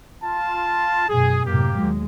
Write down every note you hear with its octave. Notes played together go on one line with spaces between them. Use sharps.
F4 A5
F#2 B2 G#4
F#2 A2 C3 A#3 G4
D#2 F#3 G#3